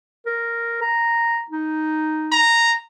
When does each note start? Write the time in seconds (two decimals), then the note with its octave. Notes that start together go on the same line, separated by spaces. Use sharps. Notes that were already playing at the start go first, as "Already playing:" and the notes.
0.26 A#4
0.81 A#5
1.50 D#4
2.32 A#5